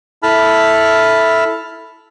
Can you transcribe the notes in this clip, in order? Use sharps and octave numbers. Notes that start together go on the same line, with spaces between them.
E4 A4 A5 B5 F6